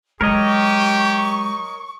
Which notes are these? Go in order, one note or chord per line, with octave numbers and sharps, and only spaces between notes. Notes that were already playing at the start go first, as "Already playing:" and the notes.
F#3 G#3 G4 A#4 C#5 D#5 C#6